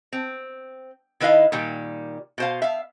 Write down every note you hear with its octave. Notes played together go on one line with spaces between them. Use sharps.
C4
D#3 E4 B4 D#5 F5
A#2 D#3 G3
B2 C5 F5
E5 F5